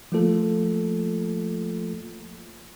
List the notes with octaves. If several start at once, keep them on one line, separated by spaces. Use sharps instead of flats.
F3 A3 A#3 F4 A4